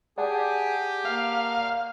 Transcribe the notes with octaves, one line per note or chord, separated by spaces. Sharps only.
G4 G#4 D5 F#5 A5
A#3 F5